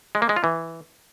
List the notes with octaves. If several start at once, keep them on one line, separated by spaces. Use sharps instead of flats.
G#3
A#3
G#3
F4
E3